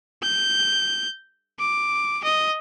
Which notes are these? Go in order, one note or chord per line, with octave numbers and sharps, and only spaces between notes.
G6
D6
D#5